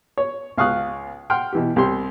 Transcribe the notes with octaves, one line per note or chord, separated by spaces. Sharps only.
C#5
C#2 F5 C#6 D#6 F#6
F#5 G5 C6 F6
B2 E3 G4
C2 G4 C6